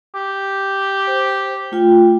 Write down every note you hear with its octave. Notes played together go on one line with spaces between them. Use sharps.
G4
C5
A3 F4 G5